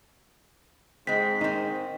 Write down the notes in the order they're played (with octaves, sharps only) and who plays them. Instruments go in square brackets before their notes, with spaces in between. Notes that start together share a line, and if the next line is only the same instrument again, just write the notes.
[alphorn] G#2 [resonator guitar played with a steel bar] G#3 C4 [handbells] B6
[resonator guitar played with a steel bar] D#3 C4 [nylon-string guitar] D#4